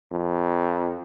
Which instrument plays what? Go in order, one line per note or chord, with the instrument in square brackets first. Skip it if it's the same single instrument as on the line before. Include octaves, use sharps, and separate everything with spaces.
[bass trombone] F2